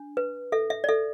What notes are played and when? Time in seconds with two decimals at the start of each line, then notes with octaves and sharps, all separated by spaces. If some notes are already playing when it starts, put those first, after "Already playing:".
Already playing: D4
0.17 B4
0.52 A4 E5
0.70 E5
0.84 D5
0.88 A4 E5